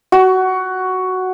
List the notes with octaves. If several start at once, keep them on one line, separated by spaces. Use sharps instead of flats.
F#4